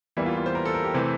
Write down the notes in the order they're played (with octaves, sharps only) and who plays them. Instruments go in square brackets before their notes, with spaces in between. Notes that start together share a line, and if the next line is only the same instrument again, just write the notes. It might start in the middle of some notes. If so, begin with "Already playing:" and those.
[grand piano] E2 E3 G3 A#3 E4
F4
F4
C5
A#4
A4
A#4
G4
C3 E3 A3 C4